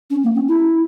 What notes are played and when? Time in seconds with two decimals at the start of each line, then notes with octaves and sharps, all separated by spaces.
0.10 C#4
0.23 A#3
0.35 C#4
0.48 E4